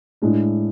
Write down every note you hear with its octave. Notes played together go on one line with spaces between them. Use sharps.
A2 G#3 D4